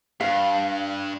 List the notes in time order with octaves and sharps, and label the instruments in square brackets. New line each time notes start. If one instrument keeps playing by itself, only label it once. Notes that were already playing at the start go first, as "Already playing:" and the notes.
[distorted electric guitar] G2 [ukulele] F5